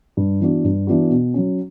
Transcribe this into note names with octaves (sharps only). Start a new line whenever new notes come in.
G2
E3 B3 D4 F#4
G2
E3 B3 D4 F#4
B2
F#3 C#4